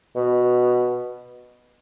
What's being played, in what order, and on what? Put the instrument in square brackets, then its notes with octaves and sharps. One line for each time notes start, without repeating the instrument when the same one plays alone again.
[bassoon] B2